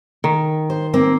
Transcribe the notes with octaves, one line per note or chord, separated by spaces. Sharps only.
D#3
C5
A#3 C4